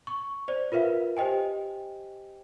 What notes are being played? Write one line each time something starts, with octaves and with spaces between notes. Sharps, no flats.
C#6
C5 D5
F4 A#4 B4 E5 F5
G4 C5 D#5 G5 G#5